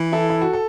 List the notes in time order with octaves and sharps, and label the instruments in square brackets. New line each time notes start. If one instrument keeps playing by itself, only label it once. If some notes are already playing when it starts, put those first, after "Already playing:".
Already playing: [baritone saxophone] E3
[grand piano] E4 A4
E4
F#4
A4